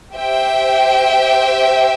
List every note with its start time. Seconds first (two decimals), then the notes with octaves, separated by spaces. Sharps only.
0.16 G4 C5 E5 G5